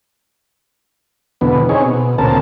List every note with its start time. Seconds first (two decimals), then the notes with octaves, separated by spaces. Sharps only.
1.41 E2 B2 D3 B3
1.69 C4 D#4 G#4 C#5
1.84 B2
2.18 D2 A#2 C#3 C4 A#4 A5